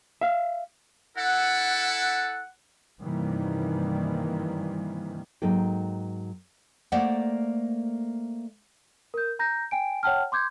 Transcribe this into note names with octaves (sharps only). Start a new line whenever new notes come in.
E5 F5
E4 A4 F#5
G2 C3 D#3 E3 G3 A#3
G#2 F#3 A#3 D#4 A4 G5
A3 A#3 C5 D5 F#5
A#4 G6
A#5 G6 A#6
G5 G#5 D7
C#5 F#5 G5 A5 F6
C6 D6 G6 G#6